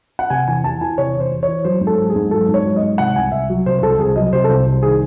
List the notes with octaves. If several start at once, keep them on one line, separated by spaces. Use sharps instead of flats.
F#5
C3 G#5
E2 G#5
E2 A5
E3 G#5
C3 C#5
E2
C5
E2
C#5
E3
F#3 C5
G#2
A4
F#3
G#4
G#2
F#3 A4
G#2
C#5
F#3
D#5
G#2
C3 F#5
C2 G#5
C2 E5
F#3
C3 C5
C5
C2 A4
C2 G#4
F#3 D#5
C3 C5
A4
C2 C5
C2
D#3 G#4